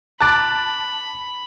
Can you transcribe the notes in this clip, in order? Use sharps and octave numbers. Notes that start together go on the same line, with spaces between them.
A5 B5 D6 F#6 A6 D7